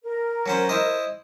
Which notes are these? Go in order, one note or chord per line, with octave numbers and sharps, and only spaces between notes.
A#4
F#3 C#4 C5
E4 C5 D#5